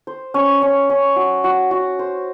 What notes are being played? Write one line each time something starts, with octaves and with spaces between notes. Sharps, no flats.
C5
C#4
C#4
C#4
F#4
F#4
F#4
C5